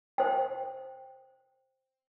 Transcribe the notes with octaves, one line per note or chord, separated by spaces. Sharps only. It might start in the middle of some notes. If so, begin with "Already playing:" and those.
C5 G5